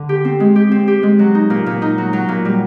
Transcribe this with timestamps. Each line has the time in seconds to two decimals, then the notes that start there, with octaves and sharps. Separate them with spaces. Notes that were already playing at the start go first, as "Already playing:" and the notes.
Already playing: D3
0.09 G4
0.25 C4
0.40 G#3
0.56 G4
0.71 C4
0.87 G4
1.03 G#3
1.19 F#3
1.35 D#4
1.50 A#2
1.66 A#2
1.82 D#4
1.98 F#3
2.13 F#3
2.28 A#2
2.45 G3